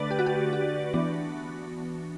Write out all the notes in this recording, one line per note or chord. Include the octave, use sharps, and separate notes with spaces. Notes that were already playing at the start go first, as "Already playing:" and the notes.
Already playing: D3 A3 D4 B4 D5
G4
F#4
G4
F#4
E3 B3 D4